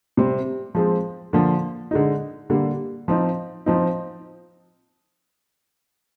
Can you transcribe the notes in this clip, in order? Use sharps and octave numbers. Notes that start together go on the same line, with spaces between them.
C3 G3 C4
F3 G#3 C4
D3 F3 A#3
D3 G#3 D#4
D3 G3 A#3
F3 C4 D#4
F3 C4 D#4